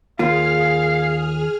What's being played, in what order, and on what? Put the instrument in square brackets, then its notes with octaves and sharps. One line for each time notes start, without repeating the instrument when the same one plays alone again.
[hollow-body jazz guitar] D#2 A#3 F4 [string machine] G#4 F6 [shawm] F5